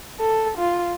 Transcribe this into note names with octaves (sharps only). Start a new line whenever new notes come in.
A4
F4